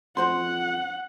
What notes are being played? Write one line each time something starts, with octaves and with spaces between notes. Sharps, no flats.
F2 F#4 C5 F#5 C6